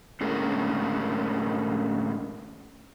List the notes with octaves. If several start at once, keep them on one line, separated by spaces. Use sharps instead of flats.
A2 D3 G#3 A#3 C#4 A#4